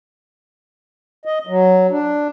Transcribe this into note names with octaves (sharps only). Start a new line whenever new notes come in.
D#5
F#3
D4